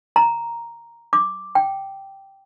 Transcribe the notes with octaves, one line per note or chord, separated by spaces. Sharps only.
A#5
D6
G5